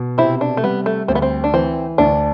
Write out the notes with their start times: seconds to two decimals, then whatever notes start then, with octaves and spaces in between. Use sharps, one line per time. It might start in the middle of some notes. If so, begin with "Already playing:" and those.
Already playing: B2
0.18 C3 C4 E4
0.41 D4
0.57 A3
0.63 G3 B3
0.86 A3
1.08 D2 C4
1.15 B3
1.22 C4
1.44 D4
1.53 E3 C4
1.98 D2 D4